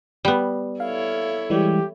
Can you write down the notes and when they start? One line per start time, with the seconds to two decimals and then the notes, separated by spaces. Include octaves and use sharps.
0.25 G3 B3
0.80 E4 A4 C#5 F5
1.50 E3 G3 G#3 G4